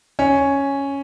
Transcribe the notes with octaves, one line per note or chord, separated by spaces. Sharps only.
C#4